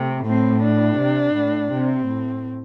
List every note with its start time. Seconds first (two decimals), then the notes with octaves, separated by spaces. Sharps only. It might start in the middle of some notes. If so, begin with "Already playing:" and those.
Already playing: C3 A3
0.27 A2 C4
0.63 D4
0.98 C3
1.36 A2
1.72 C3 C4
2.08 A2